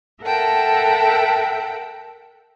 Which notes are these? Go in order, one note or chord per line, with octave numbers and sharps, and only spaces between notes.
A4 A#4 E5 F#5 G5 A5